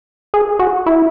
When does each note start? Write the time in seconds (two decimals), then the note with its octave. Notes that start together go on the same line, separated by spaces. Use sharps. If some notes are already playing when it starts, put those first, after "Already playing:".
0.34 G#4
0.59 F#4
0.86 E4